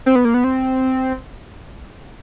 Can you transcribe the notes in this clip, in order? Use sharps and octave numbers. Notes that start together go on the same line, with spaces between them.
C4
B3
A#3
B3
C4